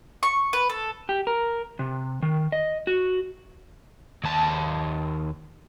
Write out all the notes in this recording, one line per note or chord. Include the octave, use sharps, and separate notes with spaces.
C#6
B4
A4
G4
A#4
C3
D#3
D#5
F#4
D#2 A5